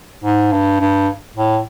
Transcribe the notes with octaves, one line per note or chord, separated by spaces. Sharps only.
G#2
G2
G2
A2